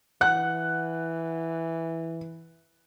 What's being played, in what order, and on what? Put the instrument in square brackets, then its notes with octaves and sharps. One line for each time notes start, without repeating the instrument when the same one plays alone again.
[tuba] E3 [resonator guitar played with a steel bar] F#5 [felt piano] F#6